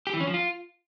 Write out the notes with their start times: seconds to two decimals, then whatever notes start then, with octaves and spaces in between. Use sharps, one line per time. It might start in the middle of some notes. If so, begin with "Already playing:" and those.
0.07 G4
0.14 E3
0.20 C#4
0.27 F3
0.34 F4